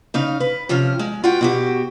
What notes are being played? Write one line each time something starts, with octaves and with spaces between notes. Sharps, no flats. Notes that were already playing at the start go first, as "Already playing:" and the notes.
C#3 D#4 F5
B4
C3 F3 C#4 F5
G#3
F4 F#4 B4 F#5 G5
B2 F#4 G4